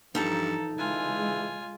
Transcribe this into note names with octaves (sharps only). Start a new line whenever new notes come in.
G2 E3 F3 D#4 A4 A5 A#5
C#3 E3 G#3 F4 G#5